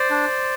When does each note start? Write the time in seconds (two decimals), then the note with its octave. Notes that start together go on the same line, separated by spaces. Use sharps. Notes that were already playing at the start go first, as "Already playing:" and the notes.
Already playing: C5 D5
0.10 D4